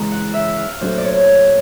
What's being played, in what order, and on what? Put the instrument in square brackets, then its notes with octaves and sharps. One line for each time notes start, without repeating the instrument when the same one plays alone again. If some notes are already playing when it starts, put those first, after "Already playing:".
Already playing: [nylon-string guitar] C#3 E3 G#3 [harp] A#5
[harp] F#5
E5
F5
[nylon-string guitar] A#2 F#3 A3 D4 [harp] C5
[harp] D5
C#5